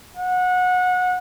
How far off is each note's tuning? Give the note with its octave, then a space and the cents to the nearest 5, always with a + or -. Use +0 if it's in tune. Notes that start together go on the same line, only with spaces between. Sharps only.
F#5 -25